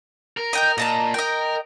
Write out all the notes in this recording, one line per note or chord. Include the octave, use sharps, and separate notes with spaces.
A#4
D#5 G5 G6
A#2 D#5 A5 A#5
A#4 D#5 G5